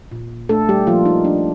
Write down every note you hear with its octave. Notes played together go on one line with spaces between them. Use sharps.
A#2
A3 D4 A4
G3 G4
F3 A#3 F4
D#4
F3 D4